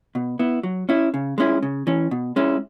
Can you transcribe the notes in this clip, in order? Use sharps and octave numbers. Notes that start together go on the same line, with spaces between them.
B2
B3 E4
F#3
C#4 E4
C#3
G#3 C#4 E4
C#3
E3 C#4
B2
G#3 C#4 E4